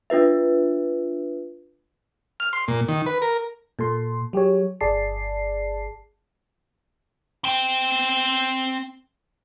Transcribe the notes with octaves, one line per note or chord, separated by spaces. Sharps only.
D4 F4 B4 E5
F6
C6
A#2
D#3
B4
A#4
A#2 A4 C6
F#3 G4 G#4 C#5
G1 G#4 D5 A5 C7
C4 G5